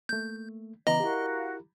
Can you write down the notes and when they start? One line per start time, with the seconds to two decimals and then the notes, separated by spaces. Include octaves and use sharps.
0.09 A3 A#3 G6
0.87 C#3 E3 B3 D5 D#5 A#5 B5 D6
1.00 E4 F#4 G4 A#4 F5